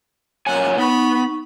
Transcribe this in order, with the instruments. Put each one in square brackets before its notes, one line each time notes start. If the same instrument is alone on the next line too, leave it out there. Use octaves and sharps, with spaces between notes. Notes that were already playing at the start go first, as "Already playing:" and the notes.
[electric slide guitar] F#2 A#2 G#5 [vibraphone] C#5 [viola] F#5
[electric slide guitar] B3 [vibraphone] D#4 C#6 [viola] B5